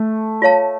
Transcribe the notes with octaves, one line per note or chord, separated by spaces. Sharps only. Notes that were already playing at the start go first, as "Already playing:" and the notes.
Already playing: A3
F4 C#5 F5 A5